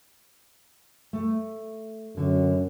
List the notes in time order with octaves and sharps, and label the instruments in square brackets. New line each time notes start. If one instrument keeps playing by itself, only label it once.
[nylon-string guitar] A3
[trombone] F#2 [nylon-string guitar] D3 C#4